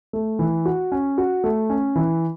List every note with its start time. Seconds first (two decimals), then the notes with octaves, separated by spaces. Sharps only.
0.13 A3
0.39 E3
0.65 F#4
0.92 C#4
1.18 F#4
1.44 A3
1.70 C#4
1.96 E3